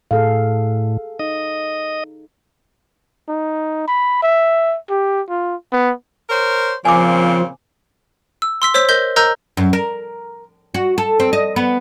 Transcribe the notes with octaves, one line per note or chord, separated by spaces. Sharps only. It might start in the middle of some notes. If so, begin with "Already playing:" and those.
A2 G#4 A4 F5
D#4 D#5
D#4
B5
E5
G4
F4
B3
A#4 C5 C#5
A#2 C#3 F3 C4 F4 G#5 D6
E6
C6 E6 B6
C5 C#5 E6 B6
A#4 D#5 G6 B6 G7
A#4 D#5 A#5 E6 G6
F#2
A#4
F#4
A4
C4
D#5
B3